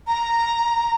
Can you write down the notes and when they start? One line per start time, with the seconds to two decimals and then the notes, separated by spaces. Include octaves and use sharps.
0.07 A#5